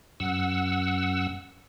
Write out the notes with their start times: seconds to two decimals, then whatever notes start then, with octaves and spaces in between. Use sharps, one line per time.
0.20 F#2 F#5 E6